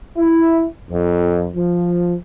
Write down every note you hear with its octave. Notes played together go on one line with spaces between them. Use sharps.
E4
F2
F3